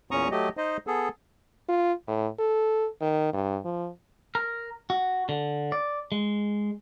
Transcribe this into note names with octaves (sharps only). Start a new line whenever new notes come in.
E2 A#2 C#4 A#5 C#6 D#6
F#3 A3 G4 D#5
D#4 C5 D#5
B3 G#4 A4
F4
A2
A4
D#3
G2
F3
A#4
F#4
D3
D5
G#3